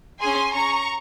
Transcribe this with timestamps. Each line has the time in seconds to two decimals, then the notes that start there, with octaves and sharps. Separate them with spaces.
0.20 C#4 G#4 G#5 C6
0.54 C#4 G#4 A#5 C#6